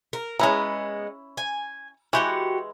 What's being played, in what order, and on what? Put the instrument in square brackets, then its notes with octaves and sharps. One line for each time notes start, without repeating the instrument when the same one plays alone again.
[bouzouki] A#4
[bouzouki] G#3 B3 [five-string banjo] C#4 E4 A#5
[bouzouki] G#5
[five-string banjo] E3 G#3 [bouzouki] F#4 G4 F#5